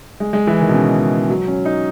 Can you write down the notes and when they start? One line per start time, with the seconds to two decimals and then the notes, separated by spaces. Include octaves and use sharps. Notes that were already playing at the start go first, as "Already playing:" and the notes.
0.20 G#3
0.33 G#3
0.47 E3
0.60 D#3
0.69 B2
0.74 C#3
1.30 F#3
1.48 C#4
1.65 D#4